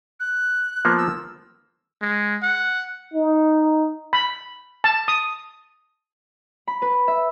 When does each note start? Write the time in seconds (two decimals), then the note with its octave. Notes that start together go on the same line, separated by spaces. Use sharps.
0.20 F#6
0.85 F3 A#3 B3
0.98 E6
2.02 G#3
2.43 F#5
3.14 D#4
4.13 B5
4.84 A5
5.08 D#6
6.67 B5
6.82 B4
7.08 E5